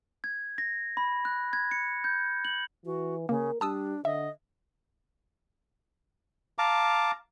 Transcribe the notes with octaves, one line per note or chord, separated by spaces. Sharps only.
G#6
A#6
B5
F#6
G#6
C#7
G6
F#7
E3 F#4
C#3 A#3 A#4
G3 D4 A5 D#6 E6
D3 D#5 E5
F5 A5 A#5 D6